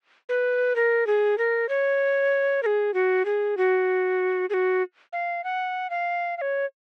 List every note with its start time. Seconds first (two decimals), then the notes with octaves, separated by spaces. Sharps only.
0.29 B4
0.76 A#4
1.07 G#4
1.38 A#4
1.69 C#5
2.63 A#4
2.66 G#4
2.94 F#4
3.25 G#4
3.57 F#4
4.50 G#4
4.54 F#4
5.13 F5
5.44 F#5
5.90 F5
6.37 F5
6.41 C#5